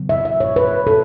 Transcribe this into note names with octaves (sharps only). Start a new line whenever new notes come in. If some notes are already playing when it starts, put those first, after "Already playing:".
Already playing: C#3 F#3 B3
E5
E5
C#5
B4
A4